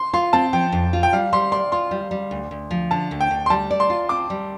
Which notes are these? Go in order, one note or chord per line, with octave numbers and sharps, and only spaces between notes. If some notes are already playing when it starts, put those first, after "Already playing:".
Already playing: C6
F4 C6
C4 A5
F3 G5
F2
F4
G5
G3 F5
G3 C6
D5 C6
F4 C6
G3
G3
D2
D2
F3
D3 A5
D2
G5
D2
C6
G3 A5
D5
C6
F4
C4 D6
G3